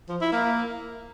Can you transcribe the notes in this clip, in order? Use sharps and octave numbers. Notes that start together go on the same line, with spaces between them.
F3
E4
A#3